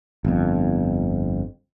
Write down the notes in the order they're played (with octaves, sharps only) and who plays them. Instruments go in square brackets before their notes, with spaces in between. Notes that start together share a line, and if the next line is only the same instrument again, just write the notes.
[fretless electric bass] G1 F2